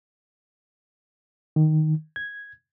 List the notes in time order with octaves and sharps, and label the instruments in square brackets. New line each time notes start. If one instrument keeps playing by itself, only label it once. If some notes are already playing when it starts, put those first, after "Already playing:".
[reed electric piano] D#3
G#6